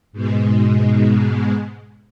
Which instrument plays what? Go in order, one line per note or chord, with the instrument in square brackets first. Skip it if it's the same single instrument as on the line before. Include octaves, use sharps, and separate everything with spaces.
[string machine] G#2 B2 G#3